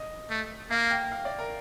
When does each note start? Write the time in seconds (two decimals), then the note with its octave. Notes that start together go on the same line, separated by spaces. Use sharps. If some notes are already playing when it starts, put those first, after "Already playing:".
Already playing: D#5
0.30 A3
0.70 A#3 F5
0.91 G5
1.12 F5
1.25 D5
1.39 A#4